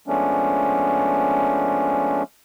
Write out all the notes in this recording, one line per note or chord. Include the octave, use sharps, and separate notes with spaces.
F3 G#3 A3 B3 C#4 D4